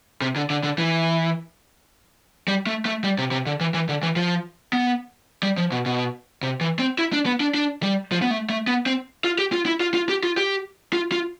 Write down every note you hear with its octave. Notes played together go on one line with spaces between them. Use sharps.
C3
D3
D3
D3
E3
G3
A3
A3
G3
C3
C3
D3
E3
E3
D3
E3
F3
B3
G3
F3
B2
B2
C3
E3
C4
E4
D4
B3
D4
D4
G3
F3
B3
A3
A3
B3
C4
F4
G4
F4
E4
F4
F4
G4
F4
G4
F4
F4